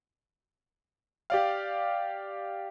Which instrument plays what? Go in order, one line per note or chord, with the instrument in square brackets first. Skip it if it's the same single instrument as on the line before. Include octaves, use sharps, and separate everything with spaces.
[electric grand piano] G4 D5 F5